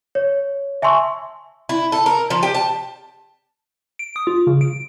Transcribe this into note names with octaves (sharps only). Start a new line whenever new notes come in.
C#5
E5 G#5 A5 C6 C#6 E6
E4
A4
A#4
F3
G4
A5
D7
D#6
F4
C#3
D7